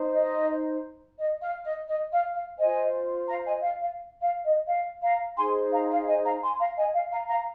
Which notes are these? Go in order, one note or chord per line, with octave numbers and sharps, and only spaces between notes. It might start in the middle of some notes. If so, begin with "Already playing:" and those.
Already playing: D#4 C5
D#5
D#5
F5
D#5
D#5
F5
F5
F4 C5 D#5 G#5
F5 A#5
D#5 G#5
F5
F5
F5
D#5
F5
F5 A#5
D#4 G#4 C5 G#5 C6
F5 A#5
F5
D#5 G#5
F5 A#5
G#5 C6
F5 A#5
D#5 G#5
F5
F5 A#5
F5 A#5